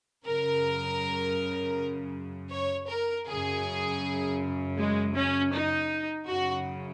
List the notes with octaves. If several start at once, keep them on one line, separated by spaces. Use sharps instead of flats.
F#2 C#3 A#4
C#5
A#4
F#2 C#3 G#4
G#3
C#4
D#4
F#2 C#3 F#4